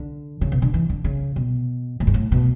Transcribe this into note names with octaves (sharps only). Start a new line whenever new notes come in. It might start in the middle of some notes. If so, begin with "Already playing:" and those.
Already playing: D3
C#3
B2
D3
E3
D3
C#3
B2
A2
G#2
A2
B2